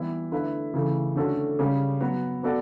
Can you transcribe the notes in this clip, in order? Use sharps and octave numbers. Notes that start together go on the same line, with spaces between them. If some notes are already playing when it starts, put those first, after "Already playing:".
Already playing: E3 G3 B3 E4
D3 A3 E4 B4 E5
C#3 E3 A3
D3 A3 C#4 F#4 A4
C#3 G3 C#4 G4
F#3 B3 F#4
B3 F#4 A4 D5